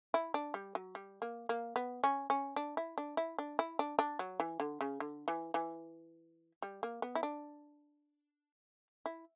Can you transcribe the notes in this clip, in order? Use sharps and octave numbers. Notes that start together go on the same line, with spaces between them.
E4
D4
G3
F#3
G3
A#3
A#3
B3
C#4
C#4
D4
E4
D4
E4
D4
E4
D4
D4
F#3
E3
D3
C#3
D3
E3
E3
G3
A#3
B3
E4
D4
E4